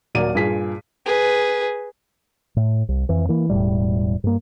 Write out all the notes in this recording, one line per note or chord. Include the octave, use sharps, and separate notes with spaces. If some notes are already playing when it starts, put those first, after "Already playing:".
D#1 F#3 A#3 D5 D#7
G2 A#2 G#4 B6
G#4 B4
A2
C2
F2 E3
E3 A#3
E1 F2 A2 G3
G2 A#3